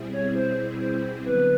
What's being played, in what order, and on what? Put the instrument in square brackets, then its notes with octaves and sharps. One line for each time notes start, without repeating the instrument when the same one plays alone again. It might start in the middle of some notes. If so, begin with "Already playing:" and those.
Already playing: [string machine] B2 G3 C4 E4 G#4
[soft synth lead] C#5
C5
C5
[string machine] D3 F#3 B3 [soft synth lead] B4